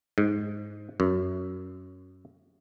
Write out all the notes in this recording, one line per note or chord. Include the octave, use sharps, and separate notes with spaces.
G#2
F#2